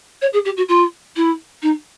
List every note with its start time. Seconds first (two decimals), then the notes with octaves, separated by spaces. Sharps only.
0.22 C#5
0.33 G#4
0.45 G4
0.57 F#4
0.69 F4
1.16 E4
1.63 D#4